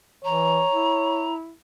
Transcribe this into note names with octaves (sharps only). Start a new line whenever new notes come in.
E3 C#5 A#5
E4